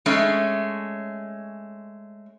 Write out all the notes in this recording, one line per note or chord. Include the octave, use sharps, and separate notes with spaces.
G#3 A3 C#4